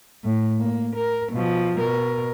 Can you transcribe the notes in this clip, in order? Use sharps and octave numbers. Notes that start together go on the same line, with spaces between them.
A2
A#3
A#4
B2 F3
B2 A#4